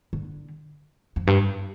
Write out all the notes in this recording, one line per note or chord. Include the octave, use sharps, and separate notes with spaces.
D3
F2
G2